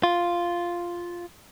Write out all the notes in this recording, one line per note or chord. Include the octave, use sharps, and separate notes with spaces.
F4